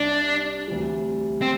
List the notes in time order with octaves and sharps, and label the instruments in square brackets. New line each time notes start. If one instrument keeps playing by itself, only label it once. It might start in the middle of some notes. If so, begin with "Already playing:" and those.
Already playing: [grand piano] C2 C3 G3 [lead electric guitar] D4
[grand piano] D2 C3 E3 G3
[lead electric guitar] C4